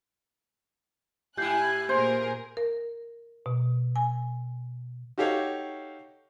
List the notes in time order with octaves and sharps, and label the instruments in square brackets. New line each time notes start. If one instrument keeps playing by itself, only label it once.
[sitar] G#2 E4 [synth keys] G4 G6 C7 [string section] G#5 F#6
[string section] A#2 G#4 A#4 [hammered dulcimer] C5
[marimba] A#4
B2
G#5
[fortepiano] D#4 F#4 G4 A4 C#5 F5